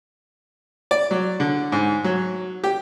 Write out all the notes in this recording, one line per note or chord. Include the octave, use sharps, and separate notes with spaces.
D5
F#3
D3
G#2
F#3
G4